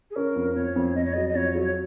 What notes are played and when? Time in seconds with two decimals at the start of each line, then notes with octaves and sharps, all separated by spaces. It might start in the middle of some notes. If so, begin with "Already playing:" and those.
0.11 G#4
0.15 C#4 A#4
0.36 F2
0.55 F2 C#5
0.76 F2
0.95 F2 D#5
1.05 C#5
1.13 F#3 D#5
1.29 D#5
1.35 F2 C#5
1.55 F#3